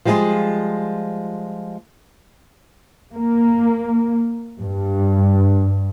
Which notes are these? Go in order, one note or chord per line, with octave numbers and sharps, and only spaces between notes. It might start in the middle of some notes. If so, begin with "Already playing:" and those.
F3 G3 G#3 F4 G#4
A#3
G2